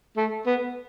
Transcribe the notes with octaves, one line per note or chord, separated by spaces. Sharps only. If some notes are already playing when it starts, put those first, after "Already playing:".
A3
B3